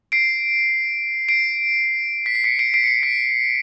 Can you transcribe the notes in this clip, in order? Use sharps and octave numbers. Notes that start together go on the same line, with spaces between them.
C7 D7
C7 D7
B6
C7
B6 C#7
C7 D7
C7 D7
C#7
C7
B6